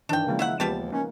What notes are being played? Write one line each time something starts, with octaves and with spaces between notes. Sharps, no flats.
G2 D#3 E3 D4 G5
C#3 F3 G#3 A#3
E4 E5 F#5
D#2 F3 G3 G#3 B3 G4 A5
A#3 C#4 D#4